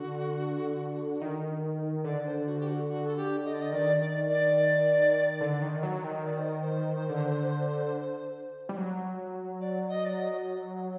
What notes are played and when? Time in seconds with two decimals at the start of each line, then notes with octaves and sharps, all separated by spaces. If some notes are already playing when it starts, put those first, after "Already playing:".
Already playing: D3 F#4
1.21 D#3
2.04 D3 D5
2.26 C5
2.46 F#4
2.60 G4
2.68 F#4
2.89 F#4
3.06 A4
3.17 G4
3.45 D#5
3.53 D5
3.61 D#5
3.73 D#3 D5
4.01 D5
4.29 D5
5.41 D3
5.62 D#3
5.83 F#3
6.04 D#3
6.25 D5
6.38 C5
6.49 A#4
6.61 C5
7.09 D3
8.69 G3
8.76 F#3
9.61 D5
9.89 D#5
10.05 D5
10.16 D#5